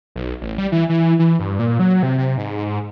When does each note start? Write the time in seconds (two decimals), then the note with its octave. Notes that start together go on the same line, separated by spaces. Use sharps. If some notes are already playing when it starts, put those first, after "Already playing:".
0.16 B1
0.41 A1
0.58 G3
0.72 E3
0.89 E3
1.19 E3
1.39 G2
1.59 A#2
1.79 F#3
2.03 C3
2.18 C3
2.37 G#2